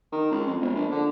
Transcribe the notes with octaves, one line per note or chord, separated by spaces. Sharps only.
D#3
C#2
F2
E1
A#1
D3